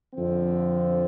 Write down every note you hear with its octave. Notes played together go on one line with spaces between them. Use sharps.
F2 D3 F3 C4